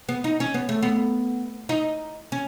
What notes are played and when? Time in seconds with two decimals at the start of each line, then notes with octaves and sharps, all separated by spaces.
0.09 B3
0.24 D#4
0.40 C#4
0.54 B3
0.69 A3
0.82 B3
1.69 D#4
2.32 C#4